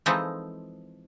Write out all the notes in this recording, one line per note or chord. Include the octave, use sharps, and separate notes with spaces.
E3 F3 G#3 C4 D#4 A4